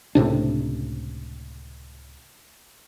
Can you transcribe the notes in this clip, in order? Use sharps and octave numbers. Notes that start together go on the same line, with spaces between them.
C#2 A2 C3 D4